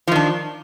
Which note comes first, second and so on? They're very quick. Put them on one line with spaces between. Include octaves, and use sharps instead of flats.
F3 D#3 D4